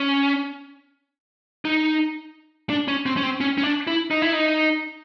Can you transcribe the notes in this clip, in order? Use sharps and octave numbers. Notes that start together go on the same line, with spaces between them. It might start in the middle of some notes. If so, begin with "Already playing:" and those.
Already playing: C#4
D#4
D4
C#4
C4
C#4
C4
C#4
C#4
D4
E4
D#4
E4
D#4